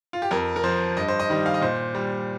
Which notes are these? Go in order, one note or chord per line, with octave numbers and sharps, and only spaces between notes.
F4
G4
F2 A#4
A#4
F3 C5
G2 D#5
C5
D#5
D#3 G3
F5
D#5
A#2 C5
G3